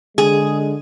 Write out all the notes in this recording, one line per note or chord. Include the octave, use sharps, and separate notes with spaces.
D3 G#3 G#4